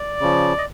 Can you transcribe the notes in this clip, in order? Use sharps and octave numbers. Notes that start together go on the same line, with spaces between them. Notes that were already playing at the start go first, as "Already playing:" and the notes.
Already playing: D5
C#3 F3
D#5